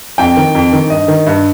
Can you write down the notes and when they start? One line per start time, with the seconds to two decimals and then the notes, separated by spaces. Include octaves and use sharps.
0.18 F2 G5
0.37 D#3
0.55 F2
0.73 D#3
0.90 G2 D#5
1.08 D#3
1.27 G2